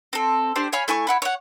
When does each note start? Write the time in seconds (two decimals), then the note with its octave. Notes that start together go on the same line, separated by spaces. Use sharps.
0.13 C4 A4
0.56 D4 G4 C5
0.73 C#5 F5 G#5 B5
0.88 A3 E4 G#5 C#6
1.07 E4 F#5 B5
1.22 C#5 F#5